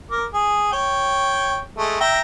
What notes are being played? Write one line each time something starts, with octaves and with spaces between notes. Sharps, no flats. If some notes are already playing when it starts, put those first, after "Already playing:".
A#4 D6
G#4
C#5 G5
G#3 A3
E5 G5 A#5